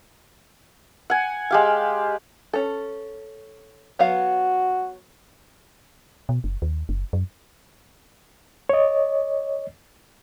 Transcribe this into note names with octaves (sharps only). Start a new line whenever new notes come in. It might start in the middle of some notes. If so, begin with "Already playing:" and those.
F#5 G#5
G#3 G4 F5
C#4 A4
F#3 B3 F#4 F5
B2
F#1
D#2
F#1
F#2
C#5 D#5